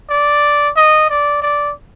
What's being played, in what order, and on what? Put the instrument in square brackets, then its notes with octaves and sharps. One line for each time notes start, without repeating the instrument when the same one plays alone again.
[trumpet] D5
D#5
D5
D5